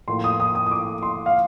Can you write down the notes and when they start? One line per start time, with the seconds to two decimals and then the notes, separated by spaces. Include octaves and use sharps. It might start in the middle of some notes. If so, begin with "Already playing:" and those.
0.08 A2 F3 A#3 C6
0.24 D#6
0.40 D#6
0.55 D#6
0.67 D#6
0.72 D6
1.03 C6
1.26 F5